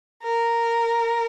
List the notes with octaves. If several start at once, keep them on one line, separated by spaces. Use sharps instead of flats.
A#4